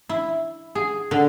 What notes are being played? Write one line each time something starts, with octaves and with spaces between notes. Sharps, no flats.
E4
G#4
D3